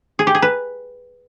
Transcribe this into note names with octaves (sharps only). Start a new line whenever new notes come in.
G#4
G4
G#4
B4